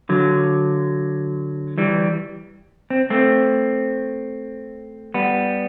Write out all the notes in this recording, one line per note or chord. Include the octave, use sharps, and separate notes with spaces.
D3 F#3
E3 G3
C4
A3 C4
G3 B3